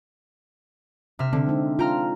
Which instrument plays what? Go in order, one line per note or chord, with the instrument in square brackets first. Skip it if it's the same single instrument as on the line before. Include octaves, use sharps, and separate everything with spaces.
[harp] C3 E5 F6
[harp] D3 [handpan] C4 D4
[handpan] G#3 D#4
[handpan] F4 [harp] G5 A#5 F6